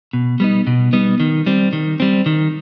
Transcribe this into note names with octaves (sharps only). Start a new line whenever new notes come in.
B2
G3 B3 D#4
B2
G3 B3 D#4
D#3
G3 C4
D#3
G3 C4
D#3